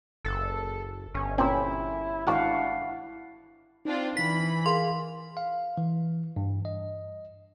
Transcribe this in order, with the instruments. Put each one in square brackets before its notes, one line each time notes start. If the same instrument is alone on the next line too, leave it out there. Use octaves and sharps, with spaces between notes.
[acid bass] F#1 [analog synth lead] A4
[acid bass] G1 [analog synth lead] C#4
[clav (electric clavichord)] A#2 C4 [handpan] C#4 [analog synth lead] E4
[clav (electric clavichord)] G#1 F#4 A5 [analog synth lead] D4 [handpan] E4 F5 F#5
[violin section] C4 D4 F4 [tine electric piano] D#4
[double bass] E3 [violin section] B5 [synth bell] B6
[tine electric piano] G#4 A#4 F5 [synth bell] C6
[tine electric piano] F5
E3
G2
D#5